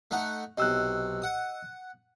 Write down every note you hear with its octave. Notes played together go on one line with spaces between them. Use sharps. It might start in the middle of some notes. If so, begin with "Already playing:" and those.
A3 D#4 F#5
B1 C3 D#5 E6 F#6
F#5 D#6